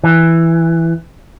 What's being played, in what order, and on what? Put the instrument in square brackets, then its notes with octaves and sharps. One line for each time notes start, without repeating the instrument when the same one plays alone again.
[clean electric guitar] E3